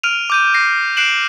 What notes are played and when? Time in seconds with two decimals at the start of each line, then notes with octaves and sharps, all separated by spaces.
0.03 F6 D7 D#7 F7
0.30 D6 G6 D#7
0.54 A#6 C7
0.97 F#6 C7 D7 E7 F#7